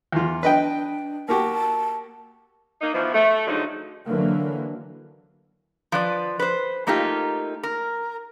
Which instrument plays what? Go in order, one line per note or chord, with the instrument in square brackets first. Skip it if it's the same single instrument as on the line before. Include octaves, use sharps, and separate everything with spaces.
[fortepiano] E2 F4
[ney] D4 [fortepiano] B4 D#5 G5
[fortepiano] A#3 F#4 G4 [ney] A5
[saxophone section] A#3 D#4
B2 E3 F3
A3
D3 F3 F#3 G#3 D#4
[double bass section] D3 E3 F#3 A#3
[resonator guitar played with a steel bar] F3 B4 D5
B4 C5
A3 A#3 D#4 F4 G4
A#4